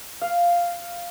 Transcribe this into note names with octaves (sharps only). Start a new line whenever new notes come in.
F5